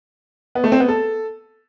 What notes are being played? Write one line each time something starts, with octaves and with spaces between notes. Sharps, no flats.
B3
A3
C4
B3
A4